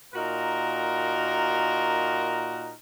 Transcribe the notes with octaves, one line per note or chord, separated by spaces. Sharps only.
A#2 D#4 F#4 A#4